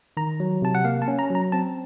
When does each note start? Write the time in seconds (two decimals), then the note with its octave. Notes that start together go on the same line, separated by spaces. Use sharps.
0.17 D#3 A#5
0.40 F#3
0.62 C3 A5
0.75 F#5
0.85 A#3 F5
1.02 A5
1.08 C#4
1.19 A#5
1.30 F#3
1.35 A#5
1.52 C4 A5